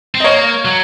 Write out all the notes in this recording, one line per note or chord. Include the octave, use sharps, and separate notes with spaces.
C4
D#5
A#3 C#5
F#3